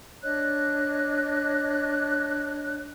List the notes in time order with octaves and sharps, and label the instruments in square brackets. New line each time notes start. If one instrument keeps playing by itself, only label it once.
[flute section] D4 C#5 D#5 F#6